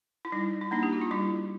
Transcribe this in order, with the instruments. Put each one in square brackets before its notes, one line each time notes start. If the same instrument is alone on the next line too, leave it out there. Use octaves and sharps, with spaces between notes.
[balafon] E4
G3 D#4
E4
A#3 D4 D#4
G4
F#4
F4
G3 E4